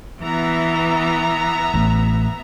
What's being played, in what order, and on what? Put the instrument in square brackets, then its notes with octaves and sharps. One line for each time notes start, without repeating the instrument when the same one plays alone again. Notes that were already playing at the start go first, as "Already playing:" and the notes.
[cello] E3 [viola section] B3 E5 A#5
[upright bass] A1